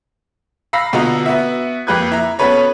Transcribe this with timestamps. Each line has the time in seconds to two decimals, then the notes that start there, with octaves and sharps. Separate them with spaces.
0.73 F5 A#5 B5 E6 A#6 C7
0.93 B2 D3 F4 F#4 D#5 A#5
1.26 B3 F#4 E5
1.87 F2 A#3 G4 B4 F#6 G#6
2.12 E4 A#5
2.39 B3 C#4 F#4 A4 B4 C#5